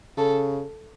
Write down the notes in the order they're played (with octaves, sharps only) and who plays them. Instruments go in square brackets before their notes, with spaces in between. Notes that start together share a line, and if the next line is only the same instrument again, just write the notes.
[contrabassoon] C#3 [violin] A4